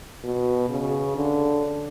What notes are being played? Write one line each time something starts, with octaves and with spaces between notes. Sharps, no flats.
B2
C#3
D3